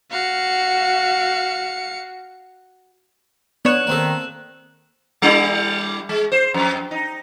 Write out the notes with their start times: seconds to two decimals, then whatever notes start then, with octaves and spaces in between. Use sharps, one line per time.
0.12 F#4 F5 C#7
3.65 B3 D4 C#5 F#6 E7 F#7
3.87 D#3 A#3 C4 A4
5.22 G3 D4 E4
6.09 G#3
6.32 C5
6.54 F2
6.91 D#4